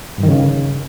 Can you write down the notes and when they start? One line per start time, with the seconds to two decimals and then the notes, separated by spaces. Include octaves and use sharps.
0.18 G2
0.23 D#3
0.28 C#3